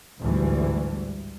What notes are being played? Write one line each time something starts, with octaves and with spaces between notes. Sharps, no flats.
A1 D2 G#2 E3 G3